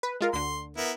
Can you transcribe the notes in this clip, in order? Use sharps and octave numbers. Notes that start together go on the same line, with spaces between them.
B4
G#3 F4 A#4
D2 D3 C6
B3 E4 A#4